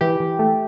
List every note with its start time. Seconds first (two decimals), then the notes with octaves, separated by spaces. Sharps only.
0.01 E3 G4
0.20 E3
0.39 A3